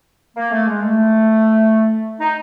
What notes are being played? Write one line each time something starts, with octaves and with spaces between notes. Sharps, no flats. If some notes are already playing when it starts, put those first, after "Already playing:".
A#3
A3
G#3
A3
D#4